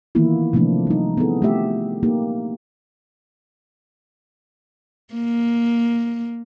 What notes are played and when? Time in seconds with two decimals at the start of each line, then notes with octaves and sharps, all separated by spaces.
0.15 D#3 E3 A#3 B3 E4 F4
0.53 C3 F3 A3 A#3 D4
0.87 G3 D#4
1.17 B3 C4 E4 G#4 A4
1.42 A3 F4 G4 E5
2.03 A#3 D#4 G4
5.14 A#3